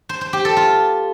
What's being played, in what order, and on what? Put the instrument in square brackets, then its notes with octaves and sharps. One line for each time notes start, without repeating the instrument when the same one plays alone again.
[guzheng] C5
C5
G4
A4
F4